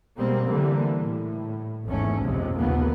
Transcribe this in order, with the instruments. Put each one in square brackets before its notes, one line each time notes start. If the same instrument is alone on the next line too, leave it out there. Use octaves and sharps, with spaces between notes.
[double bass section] B2 G3 G#3 A#3 C4
D3 E3 G3 A#3
A2
G#1 E2 G#2 A3 C#4
G1 C2 F2 C3 G#3
A#1 D#2 C#3 F3 A#3 B3